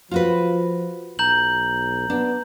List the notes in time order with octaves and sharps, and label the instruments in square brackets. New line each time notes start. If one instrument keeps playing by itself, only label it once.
[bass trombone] F3 [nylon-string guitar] F4 F#4 B4
[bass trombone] B1 [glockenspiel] A#5 G6 F#7
[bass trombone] B3 [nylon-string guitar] D4